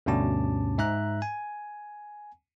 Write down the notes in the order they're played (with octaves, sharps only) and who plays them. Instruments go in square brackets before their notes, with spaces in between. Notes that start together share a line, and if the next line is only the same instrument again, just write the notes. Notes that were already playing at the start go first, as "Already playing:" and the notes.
[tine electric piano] D2 G2 B2 C#4 A5 D6
G#2 E5 A#5 F#6
G#5